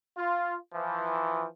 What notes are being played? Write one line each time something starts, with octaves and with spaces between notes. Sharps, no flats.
F4
E3 F3